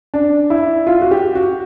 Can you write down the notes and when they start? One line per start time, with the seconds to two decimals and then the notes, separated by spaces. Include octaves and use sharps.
0.14 D4
0.50 E4
0.87 F4
1.01 F#4
1.11 G4
1.35 F#4